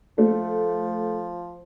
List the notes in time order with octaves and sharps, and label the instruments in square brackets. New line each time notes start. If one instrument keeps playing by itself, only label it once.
[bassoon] F3 [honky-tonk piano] A3